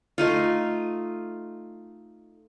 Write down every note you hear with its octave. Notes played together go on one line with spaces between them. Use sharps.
A3 D#4 F4